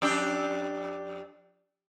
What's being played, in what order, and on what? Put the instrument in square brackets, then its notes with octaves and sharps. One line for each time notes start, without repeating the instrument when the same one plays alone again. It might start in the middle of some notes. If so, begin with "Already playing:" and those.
[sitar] F2 D4 G4